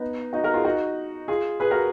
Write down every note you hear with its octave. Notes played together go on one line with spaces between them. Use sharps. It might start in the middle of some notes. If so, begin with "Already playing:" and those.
Already playing: B3 D#4
D#4 F#4
F#4 A#4
F4 G#4
D#4 F#4
F4 G#4
G#4 B4
F#4 A#4